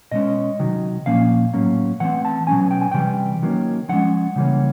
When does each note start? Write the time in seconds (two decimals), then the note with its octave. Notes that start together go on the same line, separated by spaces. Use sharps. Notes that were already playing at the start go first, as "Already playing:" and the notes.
0.12 B2 G#3 C#4 D#5
0.59 C3 D#3 F#3
1.06 A#2 F3 A#3 C#4 F5
1.53 A2 F#3 A#3 C#4
2.00 E3 A3 C4 F#5
2.25 A5
2.47 B2 F#3 A#3 C#4 G#5
2.71 G5
2.82 G#5
2.92 C3 E3 G3 G5
3.42 D#3 F#3 A#3 C#4
3.89 D3 F3 G#3 C#4 F#5
4.36 C#3 E3 G3 A#3 C#4